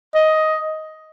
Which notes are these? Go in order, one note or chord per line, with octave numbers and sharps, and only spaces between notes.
D#5